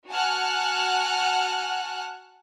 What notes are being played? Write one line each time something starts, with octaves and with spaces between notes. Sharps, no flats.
F#4 F#5 G#5 A5 F6 F#6